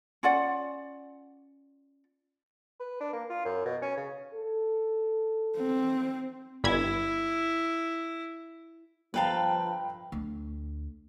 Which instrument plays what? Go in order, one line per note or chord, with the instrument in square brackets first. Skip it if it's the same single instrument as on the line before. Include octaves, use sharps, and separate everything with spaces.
[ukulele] C#4 F4 D5 F#5
[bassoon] B4
D4
A#3
F4
F#2
B2
C#4
C#3
[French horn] A4
[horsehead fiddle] C4
[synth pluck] G1 B5 G#6 [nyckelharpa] E4
[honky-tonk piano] G1 G5 A#5 [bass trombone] F3 [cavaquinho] B4 F5 A5
[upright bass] D2